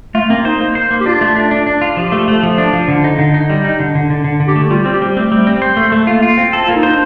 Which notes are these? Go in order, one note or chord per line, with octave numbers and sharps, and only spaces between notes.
A3 F4
A#3 C4
D#4 C5
A#3
C5
A#3
G4
D4 F4
A3
D4
D4
D4
F4
F3 G4
A3
A3
F3
D4
F3
D3
D#4
D3
D#4
G3
D#4
D3
D3
D3
D3
D3
G4
A3
G3 F4
C4
G4
G3
A3 C4
G3
C4
C5
A3
A3
A#3 F4
F4
C4
A4
A#3 F4
D#4
C5
D4